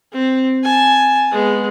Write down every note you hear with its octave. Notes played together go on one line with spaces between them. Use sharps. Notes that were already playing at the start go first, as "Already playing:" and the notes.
C4
G#5 A5
G#3 B3